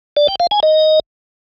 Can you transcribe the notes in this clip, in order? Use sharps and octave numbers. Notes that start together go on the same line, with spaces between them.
D5
G5
F5
G#5
D#5